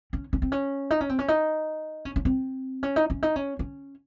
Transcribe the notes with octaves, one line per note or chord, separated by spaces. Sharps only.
C#4
C#4
C4
C#4
D#4
C#4
C4
C#4
D#4
C#4
C#4
C4
C#4
D#4
C#4
D#4
C#4
C#4